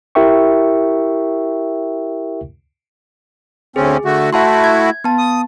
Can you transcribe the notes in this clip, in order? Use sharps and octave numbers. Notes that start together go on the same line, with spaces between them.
E4 G4 A#4 E5 G5 C#6
D2 C4 C#4 G#4
D3 A3 F#4
A3 E4 F#4 E5 A5 C6
G#6
B3 A5
D#6